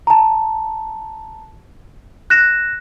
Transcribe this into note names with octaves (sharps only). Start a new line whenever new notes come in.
A5 A#5
F#6 A#6 E7